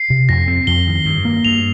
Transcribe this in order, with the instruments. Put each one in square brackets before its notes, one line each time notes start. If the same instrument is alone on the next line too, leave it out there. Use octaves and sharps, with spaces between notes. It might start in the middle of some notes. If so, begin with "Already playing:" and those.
Already playing: [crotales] C7
[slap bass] C3
[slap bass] F2 [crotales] A#6
[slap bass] C4
[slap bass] F2 [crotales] G7
[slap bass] D#3
G2
A#3
[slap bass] G2 [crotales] F7